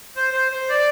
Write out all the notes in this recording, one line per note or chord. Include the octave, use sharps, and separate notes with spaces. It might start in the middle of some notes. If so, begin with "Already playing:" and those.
C5
C5
C5
D5